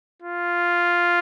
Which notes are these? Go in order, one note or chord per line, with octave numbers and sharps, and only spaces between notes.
F4